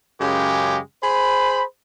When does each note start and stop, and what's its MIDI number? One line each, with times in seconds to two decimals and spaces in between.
0.20 0.79 42
0.20 0.79 49
0.20 0.79 56
0.20 0.79 67
1.03 1.63 68
1.03 1.63 72
1.03 1.63 83